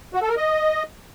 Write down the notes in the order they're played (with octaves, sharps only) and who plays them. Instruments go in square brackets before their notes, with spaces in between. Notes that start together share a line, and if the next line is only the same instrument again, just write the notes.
[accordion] F#4
A4
A#4
D#5